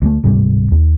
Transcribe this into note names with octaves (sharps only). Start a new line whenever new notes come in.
D2 G#3 A3
D1 G#2 C3 G3
D#2